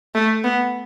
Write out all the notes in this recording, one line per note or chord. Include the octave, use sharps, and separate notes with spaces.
A3
B3